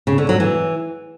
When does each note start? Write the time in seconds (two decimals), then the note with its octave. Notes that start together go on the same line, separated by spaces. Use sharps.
0.07 C#3
0.18 D3
0.29 F#3
0.40 E3